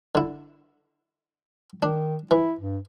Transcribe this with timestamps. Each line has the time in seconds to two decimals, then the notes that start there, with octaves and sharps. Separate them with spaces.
0.15 D3 E4
1.83 D#3 D4
2.31 E3 E4
2.60 G2